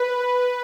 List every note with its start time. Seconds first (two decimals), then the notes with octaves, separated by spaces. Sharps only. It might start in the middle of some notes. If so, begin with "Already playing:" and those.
Already playing: B4